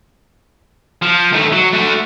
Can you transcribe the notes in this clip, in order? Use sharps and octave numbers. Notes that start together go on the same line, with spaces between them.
F3
D#2 A3
F#3
A3 F#4